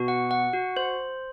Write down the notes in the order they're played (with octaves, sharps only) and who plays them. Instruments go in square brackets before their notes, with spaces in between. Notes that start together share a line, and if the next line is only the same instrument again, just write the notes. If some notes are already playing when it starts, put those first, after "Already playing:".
Already playing: [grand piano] B2 [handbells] F#4
[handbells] F#5
F#5
F#4
C5